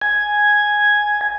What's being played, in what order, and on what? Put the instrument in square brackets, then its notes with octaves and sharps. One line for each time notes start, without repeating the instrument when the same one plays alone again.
[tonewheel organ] G#5